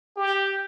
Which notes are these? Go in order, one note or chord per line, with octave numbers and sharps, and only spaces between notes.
G4